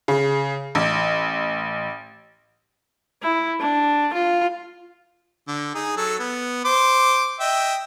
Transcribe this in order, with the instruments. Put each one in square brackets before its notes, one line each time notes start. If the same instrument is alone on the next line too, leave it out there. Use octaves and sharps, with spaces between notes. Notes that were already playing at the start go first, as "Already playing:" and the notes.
[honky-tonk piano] C#3
A1
[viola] E4
D4
F4
[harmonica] D3
D#4 G#4
F#3 A4
B3
C5 D6
D#5 E5 G5